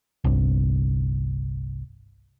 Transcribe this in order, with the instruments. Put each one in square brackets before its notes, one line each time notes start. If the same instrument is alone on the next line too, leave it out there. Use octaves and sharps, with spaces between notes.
[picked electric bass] G1 C2